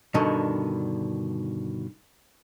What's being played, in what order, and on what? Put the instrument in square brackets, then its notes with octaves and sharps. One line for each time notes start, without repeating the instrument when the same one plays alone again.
[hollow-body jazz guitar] G2 B2 D3 D#3